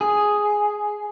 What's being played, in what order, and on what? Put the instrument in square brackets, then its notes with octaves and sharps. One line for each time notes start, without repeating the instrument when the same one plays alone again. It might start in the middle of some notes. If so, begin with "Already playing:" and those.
[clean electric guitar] G#4